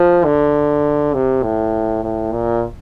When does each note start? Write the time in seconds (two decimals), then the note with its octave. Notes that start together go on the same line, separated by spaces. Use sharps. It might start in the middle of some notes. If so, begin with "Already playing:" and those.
Already playing: F3
0.25 D3
1.14 C3
1.43 A2
2.04 A2
2.33 A#2